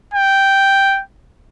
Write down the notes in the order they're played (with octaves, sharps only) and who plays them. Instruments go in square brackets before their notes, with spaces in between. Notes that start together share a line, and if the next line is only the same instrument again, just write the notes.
[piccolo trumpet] G5